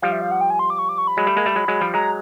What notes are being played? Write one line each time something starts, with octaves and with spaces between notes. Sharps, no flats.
F3 G3 F5
E5
F5
F#5
G5
G#5
C6
D6
C#6
D6
C#6
B5
F#3 G#3
G3 A3
G#3 A#3
G3 A3
F#3 G#3
F#3 G#3
F3 G3
F#3 G#3 A#5